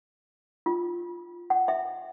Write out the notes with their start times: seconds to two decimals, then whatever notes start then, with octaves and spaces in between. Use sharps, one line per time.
0.66 F4
1.50 F#5
1.68 E5